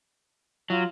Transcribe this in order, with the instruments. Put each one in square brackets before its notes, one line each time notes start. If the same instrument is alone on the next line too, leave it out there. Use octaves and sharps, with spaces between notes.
[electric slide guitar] F#3 [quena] F4